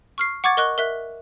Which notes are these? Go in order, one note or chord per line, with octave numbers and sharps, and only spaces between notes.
C#6 F6 C7
F#5 C#6 D6 G#6 A6
A#4 D#5 C#6 F#6 G7
A#4 E5 F#6